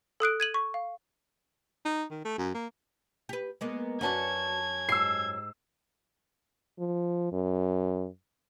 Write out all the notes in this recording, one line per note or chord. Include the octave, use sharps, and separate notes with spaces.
A4 D#6 F#6 D7
G#6 D#7 F#7
C#6
F5
D#4
D#3
A3
F#2
A#3
G4 B4
G#3 A#3 B3
F#2 C#4 F#4 B4 D5 A5 G#6
G#2 G4 E6 C7
F3
F#2